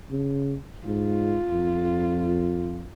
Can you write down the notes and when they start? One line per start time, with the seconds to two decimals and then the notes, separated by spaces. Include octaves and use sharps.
0.11 C#3
0.86 G#2 F4
1.52 F2